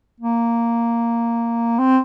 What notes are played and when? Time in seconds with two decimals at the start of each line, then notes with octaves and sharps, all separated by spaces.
0.21 A#3
1.79 C4